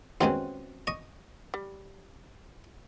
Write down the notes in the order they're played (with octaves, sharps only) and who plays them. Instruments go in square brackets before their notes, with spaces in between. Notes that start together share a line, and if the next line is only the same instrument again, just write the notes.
[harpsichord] D#2 B2 G#3 [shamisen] C4 C#4 F#4
[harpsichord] D#5 C#6
[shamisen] G3